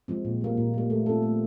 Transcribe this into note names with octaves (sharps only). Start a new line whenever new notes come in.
F3 G#3 C4
A#2
G3 A#3
A#2
G3 A#3
A3
C4 F4 A4
A3